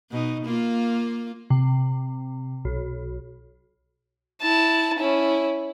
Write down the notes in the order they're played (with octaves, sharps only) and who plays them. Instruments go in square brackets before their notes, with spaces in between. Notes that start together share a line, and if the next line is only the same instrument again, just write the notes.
[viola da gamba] B2 D#4
A#3 F4
[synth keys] C3
B1
[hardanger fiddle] E4 A5
C#4 E4